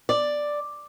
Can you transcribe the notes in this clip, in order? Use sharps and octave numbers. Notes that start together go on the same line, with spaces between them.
D5